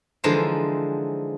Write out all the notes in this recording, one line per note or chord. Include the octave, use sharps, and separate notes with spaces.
D3 E3 F3 G#3 D#4 C5